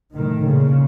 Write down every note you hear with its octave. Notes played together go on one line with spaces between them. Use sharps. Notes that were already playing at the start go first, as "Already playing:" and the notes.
A2 D#3
A#2 C#3